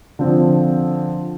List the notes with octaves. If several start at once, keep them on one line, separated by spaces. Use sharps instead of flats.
D3 F3 C4